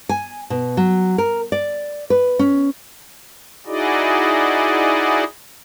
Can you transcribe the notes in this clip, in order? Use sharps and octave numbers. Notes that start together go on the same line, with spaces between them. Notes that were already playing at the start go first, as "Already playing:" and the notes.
G#5
B2
F#3
A#4
D5
B4
C#4
D#4 E4 F#4 G#4 D5 D#5